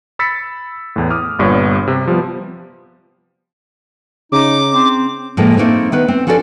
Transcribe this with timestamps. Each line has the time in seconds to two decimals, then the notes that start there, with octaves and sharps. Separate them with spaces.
0.19 B5 E6 A6 B6 C#7
0.96 E2 A2
1.10 D6 D#6 F6
1.39 G1 G2 A#2 B3 C#5
1.87 C3
2.07 F3 G3 B3
4.32 C#3 D#4 D6
4.73 C4
5.37 A2 F3 G#3 A#3
5.57 A3 A#3 C4 D#4 E5
5.92 D#3 B3 B4
6.08 C4
6.27 F3 C#4 F#4 A4 A#4 D5